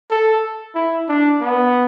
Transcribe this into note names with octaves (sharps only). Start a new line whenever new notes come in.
A4
E4
D4
B3